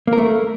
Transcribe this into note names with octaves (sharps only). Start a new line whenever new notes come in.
A#3
A#4
A3